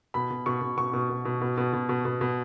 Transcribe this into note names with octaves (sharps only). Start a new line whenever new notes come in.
B2 B5
B2
B2 C#6
B2
B2 C#6
B2
B2
B2
B2
B2
B2
B2
B2
B2